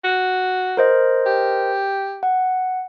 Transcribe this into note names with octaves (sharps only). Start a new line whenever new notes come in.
F#4
A#4 C5 D#5
G4
F#5